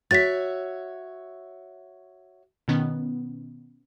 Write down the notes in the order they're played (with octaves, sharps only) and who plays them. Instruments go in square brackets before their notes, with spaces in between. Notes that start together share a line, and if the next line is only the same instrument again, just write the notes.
[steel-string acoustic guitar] F#4 C#5 E5 [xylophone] A6 B6
[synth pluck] B2 D#3 B3 C#4